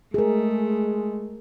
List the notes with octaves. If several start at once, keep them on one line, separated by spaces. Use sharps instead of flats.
G#3 A3 G#4 A#4